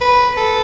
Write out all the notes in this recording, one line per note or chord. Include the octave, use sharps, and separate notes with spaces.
B4
A4